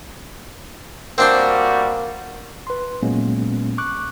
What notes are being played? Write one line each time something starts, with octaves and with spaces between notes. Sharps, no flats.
G3 A#3 C4 D4 F#4 C5
B4 C6
A#2 F#3 G#3 A#3 B3 C#4
C#6 D6 F#6